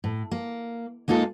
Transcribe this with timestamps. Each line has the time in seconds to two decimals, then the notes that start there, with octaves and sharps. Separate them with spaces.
0.04 A2
0.31 A#3
1.08 G#3 A#3 D#4 F4 A4